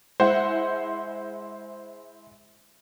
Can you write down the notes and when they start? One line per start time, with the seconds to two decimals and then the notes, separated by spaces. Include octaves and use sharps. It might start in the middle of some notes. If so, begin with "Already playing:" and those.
0.20 G#3 E4 C5 F#5